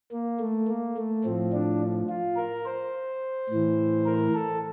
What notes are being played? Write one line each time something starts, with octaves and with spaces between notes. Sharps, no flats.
A#3
A3
A#3
A3
A2 F3 C4
D4
F4
A#4
C5
A2 E3
A#4
A4